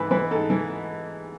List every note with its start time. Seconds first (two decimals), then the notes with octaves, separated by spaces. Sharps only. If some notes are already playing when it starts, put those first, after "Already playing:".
Already playing: G#2 E3 B4
0.11 E3 B4
0.31 G#2 A4
0.50 E3